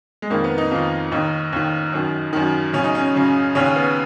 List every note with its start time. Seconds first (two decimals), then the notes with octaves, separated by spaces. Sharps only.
0.22 G#3
0.30 F2 D#3 A#3
0.44 B3
0.58 D#4
0.71 F2 D#3 F4
1.12 D#2 D#3 D#4
1.53 D#2 D#3
1.93 F#2 D#3
2.33 F#2 D#3
2.73 F#2 C#3 C#4
2.84 D#4
2.95 C#4
3.14 F#2 C#3
3.55 D#2 C#3 C#4
3.76 B3